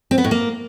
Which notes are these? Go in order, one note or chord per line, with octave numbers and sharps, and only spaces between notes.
C4
B3
A2
A#3